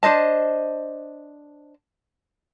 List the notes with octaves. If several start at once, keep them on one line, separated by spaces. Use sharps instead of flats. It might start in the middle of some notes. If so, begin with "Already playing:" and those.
D4 C5 D#5 A5